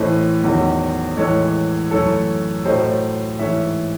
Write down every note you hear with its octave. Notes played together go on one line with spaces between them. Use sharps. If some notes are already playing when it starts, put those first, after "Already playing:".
Already playing: A2 E3 A3 C5 D#5
E2 D#3 F#3
A2 E3 G#3 A4 C#5
F#2 E3 A3 A4 C#5
A2 F#3 A3 C5 D#5
G#2 E3 A3 C#5 E5